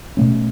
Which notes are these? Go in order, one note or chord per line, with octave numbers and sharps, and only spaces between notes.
B2 A3 C#4